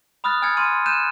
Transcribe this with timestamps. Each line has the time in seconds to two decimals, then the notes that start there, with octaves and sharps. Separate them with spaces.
0.24 B5 D#6 F6 F#6 A6
0.42 G#5 F6 G#6 A6 C#7
0.57 C6 F6 D#7
0.86 F#6 G6 D#7 E7